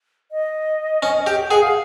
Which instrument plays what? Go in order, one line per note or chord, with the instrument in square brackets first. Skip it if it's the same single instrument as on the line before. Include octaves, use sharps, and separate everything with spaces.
[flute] D#5
[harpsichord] C#4
G4
[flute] G5
[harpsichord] G#4 [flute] F#5
[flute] F5